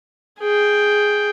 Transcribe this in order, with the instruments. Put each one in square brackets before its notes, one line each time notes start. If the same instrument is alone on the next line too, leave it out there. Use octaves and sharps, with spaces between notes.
[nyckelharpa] G#4 G5